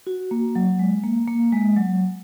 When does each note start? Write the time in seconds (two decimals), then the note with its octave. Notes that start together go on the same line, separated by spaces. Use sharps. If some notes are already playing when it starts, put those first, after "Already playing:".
0.07 F#4
0.31 A#3
0.55 F#3
0.79 G#3
1.03 A#3
1.28 A#3
1.52 G#3
1.77 F#3